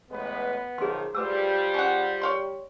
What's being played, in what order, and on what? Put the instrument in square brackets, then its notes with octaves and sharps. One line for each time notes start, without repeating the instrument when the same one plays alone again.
[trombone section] A1 G#3 B4 [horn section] B3
[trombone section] B1 D#3 F3 [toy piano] G#4 C6
[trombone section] G3 [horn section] F4 G#4 C5 [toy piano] B4 D6 E6
[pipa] C#4 F#5
C#5 F5 C6